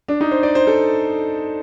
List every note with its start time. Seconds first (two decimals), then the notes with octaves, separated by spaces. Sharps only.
0.08 D4
0.21 D#4
0.31 C5
0.43 D5
0.55 C5
0.67 A4